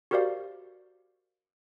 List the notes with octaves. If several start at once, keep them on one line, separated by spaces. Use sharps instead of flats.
F#4 G4 A#4 C5 D5 F5